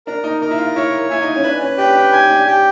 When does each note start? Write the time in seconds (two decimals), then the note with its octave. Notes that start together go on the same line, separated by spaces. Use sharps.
0.07 D4 A#4
0.24 D#4
0.42 D#4 A#4
0.51 E4
0.58 F4
0.76 E4 C#5
1.10 E4 G#5
1.22 D#4
1.36 C#4
1.44 D4 B4
1.61 C#4
1.78 D4 G4
1.95 D4
2.12 D#4 G#5
2.30 D4
2.47 G4